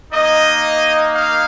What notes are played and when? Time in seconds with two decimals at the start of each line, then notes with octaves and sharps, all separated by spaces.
0.11 A#3 D#4 D#5
1.15 F5